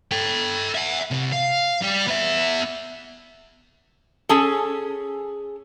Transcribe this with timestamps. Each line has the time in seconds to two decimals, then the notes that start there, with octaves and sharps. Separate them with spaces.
0.11 A4 G5
0.75 E5 F#5
1.11 C2 C3
1.33 F5
1.82 G3 G4
2.07 B3 E5
4.29 C#4 G#4 A4